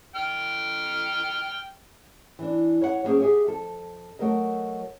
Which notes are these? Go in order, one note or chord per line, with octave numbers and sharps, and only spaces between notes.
G5 F6
E3 D4
C#5 E5 F#5
F#3 G3 A#3 C#4 G#4 C5
G4 G#4 E5 F#5 G#5
F2 A4
F#3 A3 A#4 D#5